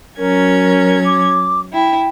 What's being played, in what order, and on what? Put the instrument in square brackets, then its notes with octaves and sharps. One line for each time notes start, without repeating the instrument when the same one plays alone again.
[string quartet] F#3 C#4 G#6 [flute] A#4
[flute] D6
[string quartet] E4 [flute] G5